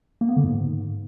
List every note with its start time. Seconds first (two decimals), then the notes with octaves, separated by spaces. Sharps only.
0.21 A#3
0.29 B3
0.36 D3
0.44 G#2